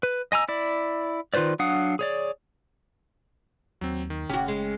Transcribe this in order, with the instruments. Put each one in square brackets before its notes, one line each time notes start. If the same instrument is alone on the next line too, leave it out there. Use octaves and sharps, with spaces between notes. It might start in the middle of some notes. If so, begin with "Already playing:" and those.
[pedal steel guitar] B4
D#5 G#5 A#5 E6
E4 D5
D#3 F4 B4 C5 D5
F#3 D4 F5 F#5 D#6
G#4 C#5 D5
[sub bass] D#2 [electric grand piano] F#3 C4
[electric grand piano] D#3
[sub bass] F#1 [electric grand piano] C#3 C#4 [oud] F#4 G4
[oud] G#3